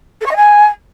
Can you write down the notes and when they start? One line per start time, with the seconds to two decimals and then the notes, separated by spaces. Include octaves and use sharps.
0.20 A4
0.25 C#6
0.30 D#5
0.35 G#5